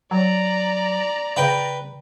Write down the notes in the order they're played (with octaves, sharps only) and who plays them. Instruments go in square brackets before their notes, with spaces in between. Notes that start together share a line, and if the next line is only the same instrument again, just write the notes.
[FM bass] F#3 [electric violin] D5 A#5
[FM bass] C#3 [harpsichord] B4 G5 B5